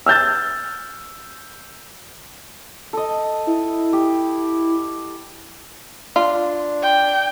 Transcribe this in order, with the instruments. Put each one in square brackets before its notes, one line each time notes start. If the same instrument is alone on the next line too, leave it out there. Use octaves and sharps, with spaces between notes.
[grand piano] E6 F6 G6 A6
[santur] A4 D#5
[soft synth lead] E4
[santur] G4
[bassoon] D4 [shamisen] F4
[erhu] G5